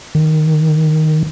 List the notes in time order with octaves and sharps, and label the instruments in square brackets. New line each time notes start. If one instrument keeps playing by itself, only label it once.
[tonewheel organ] D#3